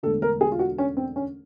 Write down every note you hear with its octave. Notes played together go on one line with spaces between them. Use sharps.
E1 D2 D3 A4
A#4
G#4
F4
F#4
C#4
C4
C#4